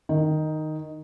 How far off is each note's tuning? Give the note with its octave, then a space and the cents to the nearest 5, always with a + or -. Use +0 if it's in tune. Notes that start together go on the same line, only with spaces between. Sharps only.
D#3 -5